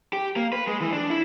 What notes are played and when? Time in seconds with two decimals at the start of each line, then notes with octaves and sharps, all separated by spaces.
0.13 G4
0.36 A#3
0.53 B4
0.67 G#3
0.81 E3
0.93 D4
1.10 E4